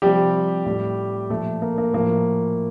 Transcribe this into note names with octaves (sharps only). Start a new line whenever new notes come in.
C3 F3 G3 G4
A2 G3
A#2 F3 A3
A#3
A#3
A2 F3 A#3